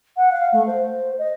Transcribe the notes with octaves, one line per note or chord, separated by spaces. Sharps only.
F#5
F5
A3
C5
D#5